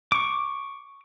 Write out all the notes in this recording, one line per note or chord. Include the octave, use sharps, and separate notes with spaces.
C#6 D6